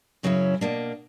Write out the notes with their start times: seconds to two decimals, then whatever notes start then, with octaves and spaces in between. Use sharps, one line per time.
0.23 F#2 C#3 F#3 C#4 E4
0.61 B2 A#3 D4